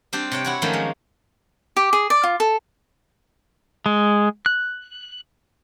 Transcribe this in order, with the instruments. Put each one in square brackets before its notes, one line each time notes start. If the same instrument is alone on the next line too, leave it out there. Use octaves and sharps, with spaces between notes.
[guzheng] G3 C4 D4 G4
C3 C#5 G5
E4 F#4 C#5
D#3 F3 F#3 A3 A#3 C#4
G#3
[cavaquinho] G4
G#4
D5
F4
A4
[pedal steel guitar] G#3
F#6